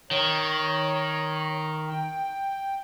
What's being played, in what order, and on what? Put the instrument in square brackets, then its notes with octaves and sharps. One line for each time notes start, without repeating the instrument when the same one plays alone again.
[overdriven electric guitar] D#3 [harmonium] C#5
[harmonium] G5